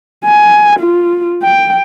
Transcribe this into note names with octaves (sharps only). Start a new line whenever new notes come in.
G#5
F4
G5